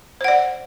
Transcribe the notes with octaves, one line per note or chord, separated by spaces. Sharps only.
C5 D5 F#5